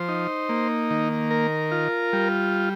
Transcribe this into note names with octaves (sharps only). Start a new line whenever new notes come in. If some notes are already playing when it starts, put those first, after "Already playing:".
Already playing: F3 C5
D#4
A#3
D#3
A#4
F4
G3